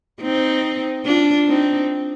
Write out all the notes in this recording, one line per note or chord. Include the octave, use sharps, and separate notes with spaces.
C4 D#4
D4 F4
C4 D#4